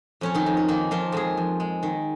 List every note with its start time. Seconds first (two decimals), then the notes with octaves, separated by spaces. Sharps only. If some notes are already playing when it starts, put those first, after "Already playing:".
0.21 F2 C#4 C#5
0.35 D#3 D#4
0.46 F2
0.57 C#4
0.68 D#3 A#3 D#4
0.91 D#3 F3 F4
1.12 F2 G#3 G#4
1.37 F2
1.60 G#3
1.83 D#3